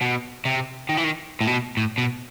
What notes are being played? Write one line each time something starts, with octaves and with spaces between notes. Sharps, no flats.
B2
C3
D#3
E3
D#3
A2
B2
A2
B2